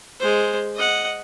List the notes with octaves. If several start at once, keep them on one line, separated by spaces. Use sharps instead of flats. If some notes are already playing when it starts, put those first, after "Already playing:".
G#3 C5
D#5 F#5